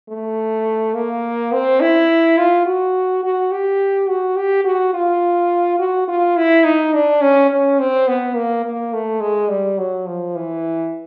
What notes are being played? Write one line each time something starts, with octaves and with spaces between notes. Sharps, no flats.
A3
A#3
C4
E4
F4
F#4
F#4
G4
F#4
G4
F#4
F4
F#4
F4
E4
D#4
D4
C#4
C#4
C4
B3
A#3
A#3
A3
G#3
G3
F#3
F3
E3